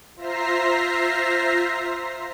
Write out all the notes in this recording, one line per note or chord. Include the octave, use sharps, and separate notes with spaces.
F4 C5 E5 A#5 A#6 C7